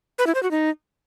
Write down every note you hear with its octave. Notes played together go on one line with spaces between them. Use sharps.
B4
E4
C5
F#4
D#4